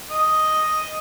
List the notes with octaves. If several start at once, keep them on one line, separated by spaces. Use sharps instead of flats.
D#5